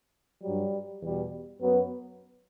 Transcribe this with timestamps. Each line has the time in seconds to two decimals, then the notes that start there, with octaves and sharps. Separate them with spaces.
0.43 G2 F#3 G3
1.02 E2 B2 G3
1.60 F#2 F#3 B3